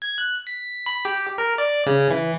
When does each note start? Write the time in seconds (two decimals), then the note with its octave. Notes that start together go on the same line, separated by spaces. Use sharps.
0.02 G#6
0.18 F#6
0.47 B6
0.86 B5
1.05 G4
1.38 A#4
1.58 D5
1.86 C#3
2.10 E3